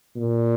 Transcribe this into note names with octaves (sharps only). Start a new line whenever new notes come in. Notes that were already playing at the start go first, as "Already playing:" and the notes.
A#2